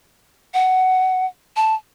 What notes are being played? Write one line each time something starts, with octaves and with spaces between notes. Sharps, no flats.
F#5
A5